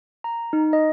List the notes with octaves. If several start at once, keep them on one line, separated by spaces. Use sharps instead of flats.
A#5
D#4
D#5